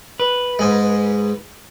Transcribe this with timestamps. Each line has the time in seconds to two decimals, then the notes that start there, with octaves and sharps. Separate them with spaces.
0.20 B4
0.59 G#2 G#3